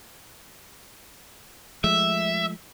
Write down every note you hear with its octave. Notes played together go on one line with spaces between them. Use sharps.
F3 G#3 A3 E5